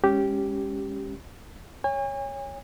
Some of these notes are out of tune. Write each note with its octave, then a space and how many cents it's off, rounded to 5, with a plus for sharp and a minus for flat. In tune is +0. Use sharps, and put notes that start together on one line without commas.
G#3 -20 C#4 +0 G4 -10
C#5 +0 G#5 -40